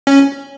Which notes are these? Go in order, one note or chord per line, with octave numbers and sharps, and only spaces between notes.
C#4